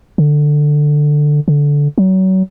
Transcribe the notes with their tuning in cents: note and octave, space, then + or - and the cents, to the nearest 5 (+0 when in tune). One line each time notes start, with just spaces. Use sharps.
D3 +10
D3 -15
F#3 +30